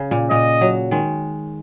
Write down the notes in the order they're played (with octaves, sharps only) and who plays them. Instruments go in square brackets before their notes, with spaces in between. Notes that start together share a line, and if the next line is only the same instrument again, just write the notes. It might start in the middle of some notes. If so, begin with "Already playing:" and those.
Already playing: [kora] C#3
A#2
[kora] A#2 [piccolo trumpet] D#5
[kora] F#3
D#3 G#3